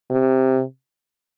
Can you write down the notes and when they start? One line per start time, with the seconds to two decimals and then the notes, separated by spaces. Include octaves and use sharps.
0.11 C3